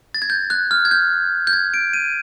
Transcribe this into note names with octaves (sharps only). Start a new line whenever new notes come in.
A6
G#6
G6
F#6
F6
G#6
G6
G6
G#6
D7
D#7